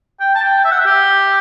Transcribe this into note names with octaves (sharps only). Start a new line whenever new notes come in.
G5
A5
G5
E5
F#5
E5
G4